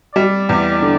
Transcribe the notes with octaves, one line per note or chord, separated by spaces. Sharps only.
G3 D5
E2
D3